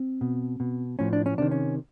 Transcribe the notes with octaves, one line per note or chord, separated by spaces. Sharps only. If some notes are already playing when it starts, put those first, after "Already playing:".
Already playing: C4
B2
B2
A2 F3 C#4
D4
C#4
C3 D#3 D4
C#4